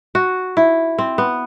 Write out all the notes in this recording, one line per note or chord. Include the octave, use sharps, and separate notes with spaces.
F#4
E4
C4
B3